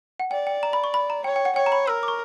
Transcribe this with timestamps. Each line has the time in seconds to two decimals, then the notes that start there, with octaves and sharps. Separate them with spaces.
0.20 F#5
0.31 D5 G5
0.47 G5
0.63 A#5
0.73 B5
0.84 C#6
0.94 B5
1.10 A#5
1.24 C#5 G5
1.36 G5
1.45 F#5
1.56 C#5 G5
1.66 A#5
1.72 B5
1.87 A#4 E6
2.03 D6
2.08 C#6